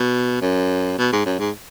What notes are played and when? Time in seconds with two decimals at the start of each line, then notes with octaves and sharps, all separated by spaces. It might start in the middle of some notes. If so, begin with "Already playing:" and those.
Already playing: B2
0.41 F#2
0.98 B2
1.12 G#2
1.25 F#2
1.40 G#2